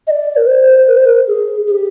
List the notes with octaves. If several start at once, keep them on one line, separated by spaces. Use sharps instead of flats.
D#5
D5
A#4
C5
A#4
C5
A#4
G#4
G#4
G4